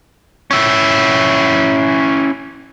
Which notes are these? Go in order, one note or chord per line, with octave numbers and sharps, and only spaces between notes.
C#4 E4